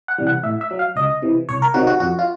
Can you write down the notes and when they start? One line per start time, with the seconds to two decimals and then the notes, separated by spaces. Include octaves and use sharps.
0.08 F#5
0.18 C3 E3 G3
0.27 F#5
0.43 A2 E5
0.61 E5
0.71 F#3
0.79 F5
0.96 C#2 D#5
1.22 C3 E3
1.49 C2 C#5
1.62 A#4
1.74 C3 D#3 F#3 F#4
1.87 F#4
2.00 F2 F#4
2.19 F4